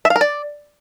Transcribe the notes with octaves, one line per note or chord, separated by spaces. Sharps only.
E5
F5
A#4
D5